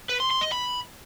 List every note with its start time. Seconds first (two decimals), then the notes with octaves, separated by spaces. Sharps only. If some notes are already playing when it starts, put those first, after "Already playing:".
0.09 B4
0.20 C6
0.31 C6
0.41 D#5
0.52 B5